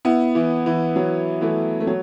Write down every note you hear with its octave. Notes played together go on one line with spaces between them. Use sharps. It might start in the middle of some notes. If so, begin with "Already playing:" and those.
B3 E4
E3
E3
F#3
E3 A3
A3
F#3